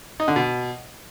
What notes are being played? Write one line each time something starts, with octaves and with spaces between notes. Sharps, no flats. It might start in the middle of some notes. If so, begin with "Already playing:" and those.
D#4
D3
B2